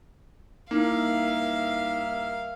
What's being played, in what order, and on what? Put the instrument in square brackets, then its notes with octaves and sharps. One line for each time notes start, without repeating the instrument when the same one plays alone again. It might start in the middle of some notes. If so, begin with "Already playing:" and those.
[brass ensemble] G2 A#4 E5 [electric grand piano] A#3 [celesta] D#4 E4 [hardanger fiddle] F5